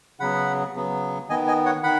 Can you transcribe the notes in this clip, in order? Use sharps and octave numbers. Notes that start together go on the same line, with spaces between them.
C#3 F#3 B3 F#5 B5
C#3 F#3 B3
D#3 B3 D#5 G#5
D#5 G#5
C#5 F#5
D#3 F#5 B5